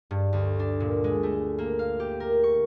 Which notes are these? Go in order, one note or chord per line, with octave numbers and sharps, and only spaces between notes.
G2
D2
D4
A#2
G#3
A3
A#3
F5
G4
A#4
C#6